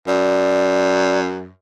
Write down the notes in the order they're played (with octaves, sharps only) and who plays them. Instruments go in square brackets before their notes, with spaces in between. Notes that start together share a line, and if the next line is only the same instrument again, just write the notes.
[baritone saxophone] F#2 [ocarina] D5